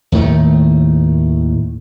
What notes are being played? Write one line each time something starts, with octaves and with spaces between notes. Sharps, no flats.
D#2 A2 D#3 A3